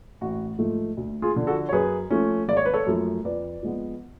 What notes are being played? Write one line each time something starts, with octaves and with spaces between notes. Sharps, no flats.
A1 F#4
G#2 F3 A3
D2
F4 G#4
D3 F3
F#4 A4
C#5
F#2 G#4 B4
F3 A3 C#4
G#1 D5
C#5
B4
A4 C#5
F#2 F3 A3
F2 B4 D5
F3 G#3 B3